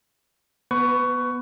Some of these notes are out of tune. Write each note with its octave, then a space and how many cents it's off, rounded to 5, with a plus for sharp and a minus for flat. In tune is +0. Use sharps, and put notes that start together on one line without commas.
B3 -15 B4 +25 C#6 +15